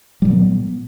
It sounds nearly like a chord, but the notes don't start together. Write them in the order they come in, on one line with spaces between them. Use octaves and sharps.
G3 A#2 F#3 B3